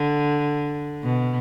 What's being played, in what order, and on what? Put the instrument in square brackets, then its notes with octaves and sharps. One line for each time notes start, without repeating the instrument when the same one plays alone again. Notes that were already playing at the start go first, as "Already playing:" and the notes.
Already playing: [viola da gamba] D3
B2